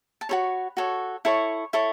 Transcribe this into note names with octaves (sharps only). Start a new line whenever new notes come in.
A5
F#4 A4 C#5 B5
F#4 A4 C#5
E4 A4 C#5 C#6
E4 A4 C#5 C#6